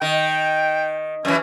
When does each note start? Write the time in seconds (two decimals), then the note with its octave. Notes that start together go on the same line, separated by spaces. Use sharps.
0.02 D#3 G5
1.25 F#2 E3 C#4